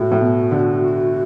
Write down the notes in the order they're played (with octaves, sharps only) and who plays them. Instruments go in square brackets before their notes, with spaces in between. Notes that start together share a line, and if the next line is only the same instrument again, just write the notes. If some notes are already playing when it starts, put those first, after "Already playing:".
Already playing: [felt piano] A2 [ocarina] F#4
[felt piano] A2
B2
D3